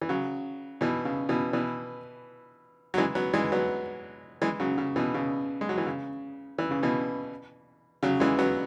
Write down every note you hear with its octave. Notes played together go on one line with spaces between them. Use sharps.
E3
C#3 F#3
B2 E3
C#3
B2 E3
B2 E3
F#3
E3 G#3
F#3 B3
E3 G#3
F#3 B3
E3 G#3
C#3 F#3
C#3
B2 E3
C#3
G#3
F#3
E3
C#3
E3
C#3
B2 E3
C#3 F#3
E3 G#3
F#3 B3